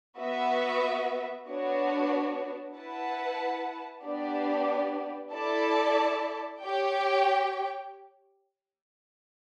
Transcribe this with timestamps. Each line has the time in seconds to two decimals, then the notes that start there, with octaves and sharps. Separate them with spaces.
0.18 B3 F#4 B4 E5
1.47 B3 D4 F#4 C#5
2.75 E4 B4 F#5 A5
4.04 B3 D4 G4 D5
5.33 E4 A4 D5 A5
6.62 G4 C#5 G5